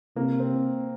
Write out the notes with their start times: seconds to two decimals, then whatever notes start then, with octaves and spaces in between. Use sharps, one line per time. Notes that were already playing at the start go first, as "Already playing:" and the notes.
0.16 C3 A#3
0.40 C4